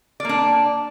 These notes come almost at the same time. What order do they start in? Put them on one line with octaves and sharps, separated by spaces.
D5 A#3 D4